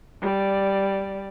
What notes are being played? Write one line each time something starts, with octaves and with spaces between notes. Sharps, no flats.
G3 D5